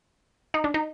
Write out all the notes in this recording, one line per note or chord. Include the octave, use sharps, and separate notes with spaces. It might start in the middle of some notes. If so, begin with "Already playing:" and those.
D#4
D4
D#4